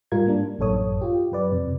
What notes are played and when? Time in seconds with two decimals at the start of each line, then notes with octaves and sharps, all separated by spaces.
0.12 G#2 G3 F4 A#4 G#6
0.27 A#3 D4
0.59 A1 F#2 A4 C#5 D#6
1.01 F4 G4
1.32 F#2 B4 D5
1.52 F2 C3